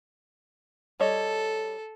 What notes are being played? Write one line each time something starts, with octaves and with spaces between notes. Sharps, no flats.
G3 A4 C#5 D#5